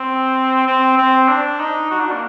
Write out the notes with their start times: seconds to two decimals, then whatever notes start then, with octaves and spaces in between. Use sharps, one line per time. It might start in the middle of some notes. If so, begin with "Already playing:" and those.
Already playing: C4
0.67 C4
0.97 C4
1.28 D4
1.60 D#4
1.91 F#4
2.00 D4
2.12 A#3